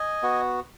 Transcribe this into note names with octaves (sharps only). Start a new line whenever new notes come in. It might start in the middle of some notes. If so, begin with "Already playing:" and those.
Already playing: D#5 G#5
B3 F#4